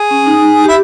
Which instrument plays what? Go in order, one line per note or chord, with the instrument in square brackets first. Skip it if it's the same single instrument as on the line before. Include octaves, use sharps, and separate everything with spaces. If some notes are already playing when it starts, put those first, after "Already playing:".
Already playing: [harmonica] G#4
[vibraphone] C#4
D#4
[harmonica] E4 [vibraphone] G4